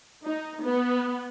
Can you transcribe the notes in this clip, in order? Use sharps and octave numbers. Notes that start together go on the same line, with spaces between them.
D#4
B3